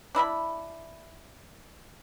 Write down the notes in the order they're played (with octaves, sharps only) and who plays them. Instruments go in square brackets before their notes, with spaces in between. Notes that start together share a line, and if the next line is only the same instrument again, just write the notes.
[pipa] D4 E4 D#5 B5